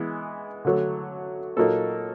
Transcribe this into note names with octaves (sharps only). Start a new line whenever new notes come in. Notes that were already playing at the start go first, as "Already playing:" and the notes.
Already playing: E3 G#3 B3
D3 F#3 A3
A#2 F#3 A#3 D#4 A4